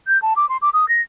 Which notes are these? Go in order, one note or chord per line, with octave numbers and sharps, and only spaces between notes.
G6
A5
D6
C6
D6
D#6
A#6